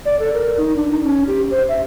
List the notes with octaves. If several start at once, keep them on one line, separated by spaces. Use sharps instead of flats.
D5
A4
A#4
D#4
D4
D#4
C#4
G4
C5
E5